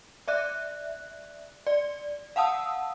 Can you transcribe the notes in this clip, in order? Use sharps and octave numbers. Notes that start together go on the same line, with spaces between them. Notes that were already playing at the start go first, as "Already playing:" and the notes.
D5 E5 F#6
D5
F5 F#5 A5 D#6 E6